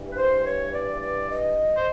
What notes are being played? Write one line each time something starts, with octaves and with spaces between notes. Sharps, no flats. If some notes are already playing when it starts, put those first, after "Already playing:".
Already playing: G2 E3
B4
C5
C#5
D5
D5
D#5
C5